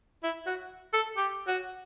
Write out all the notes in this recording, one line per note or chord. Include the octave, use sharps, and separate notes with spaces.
E4
F#4
A4
G4
F#4